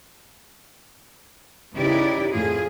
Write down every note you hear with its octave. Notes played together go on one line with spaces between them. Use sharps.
C#3 D#4 E4 G4 B4 D5
F2 A2 F4 G#4